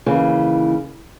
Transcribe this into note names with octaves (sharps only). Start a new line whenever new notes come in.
D#2 C#3 E3